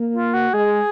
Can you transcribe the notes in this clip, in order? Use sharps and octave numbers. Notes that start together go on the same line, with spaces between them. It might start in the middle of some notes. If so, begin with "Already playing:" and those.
Already playing: A#3
F4
F#4
G#3 G#4